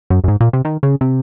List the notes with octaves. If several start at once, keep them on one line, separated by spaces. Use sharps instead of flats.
F#2
F#2
G#2
A#2
C3
D#3
C#3
C3